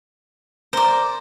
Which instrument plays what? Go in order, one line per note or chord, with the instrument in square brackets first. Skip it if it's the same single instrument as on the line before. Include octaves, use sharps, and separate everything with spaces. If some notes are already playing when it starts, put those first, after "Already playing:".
[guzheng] A#4 [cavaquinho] C5 D5